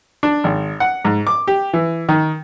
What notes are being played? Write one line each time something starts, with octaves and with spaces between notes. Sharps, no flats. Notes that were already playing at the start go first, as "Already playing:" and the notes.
D4
G#1
F#5
G#2
D6
G4
E3
D#3